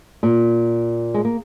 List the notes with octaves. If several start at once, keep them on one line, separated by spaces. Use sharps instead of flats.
A#2
G#3
A#3